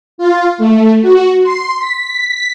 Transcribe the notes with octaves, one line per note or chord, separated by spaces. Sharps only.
F4
A3
F#4
C6
B6